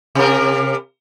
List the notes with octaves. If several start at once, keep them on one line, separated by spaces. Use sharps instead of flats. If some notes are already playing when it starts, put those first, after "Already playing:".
C3 A#4